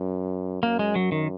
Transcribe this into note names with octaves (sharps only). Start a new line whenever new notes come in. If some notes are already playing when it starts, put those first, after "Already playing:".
Already playing: F#2
F#2 A#3
G#3
F#3
D#3